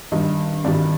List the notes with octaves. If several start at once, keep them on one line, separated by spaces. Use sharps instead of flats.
G2 D#3 G3 D#5
G2 D#3 G3 D5